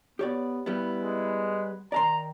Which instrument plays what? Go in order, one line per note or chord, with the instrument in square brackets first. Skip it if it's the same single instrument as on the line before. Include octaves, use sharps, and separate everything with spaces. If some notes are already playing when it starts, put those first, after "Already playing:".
[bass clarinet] B3 [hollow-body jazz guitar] G4 C#5 D5
[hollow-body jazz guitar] G3 B3 [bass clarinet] E4
[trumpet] G#3
[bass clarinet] D#3 [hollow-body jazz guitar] D5 A5 C6 [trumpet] A#5